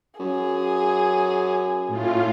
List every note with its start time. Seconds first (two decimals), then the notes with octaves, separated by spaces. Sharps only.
0.19 F#2 G#4
1.88 A2 F4